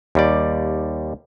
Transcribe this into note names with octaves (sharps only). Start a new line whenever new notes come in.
D#2 G3 D5